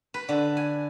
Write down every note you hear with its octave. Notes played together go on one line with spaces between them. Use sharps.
B4
D3
G#5